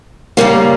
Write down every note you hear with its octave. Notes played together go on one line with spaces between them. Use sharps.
C#3 G3 A#3